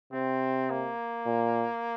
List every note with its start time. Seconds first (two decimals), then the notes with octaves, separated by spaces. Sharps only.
0.13 C3 C4
0.70 A#3
1.26 A#2